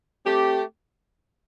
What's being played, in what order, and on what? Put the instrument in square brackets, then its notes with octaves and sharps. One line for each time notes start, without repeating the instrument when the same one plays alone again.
[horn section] A3 C4 G4